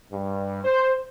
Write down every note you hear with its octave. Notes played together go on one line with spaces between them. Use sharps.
G2
C5